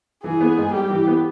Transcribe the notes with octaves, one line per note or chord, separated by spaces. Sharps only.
E3 G#4
B3
G#2
G3 G4
E3
B3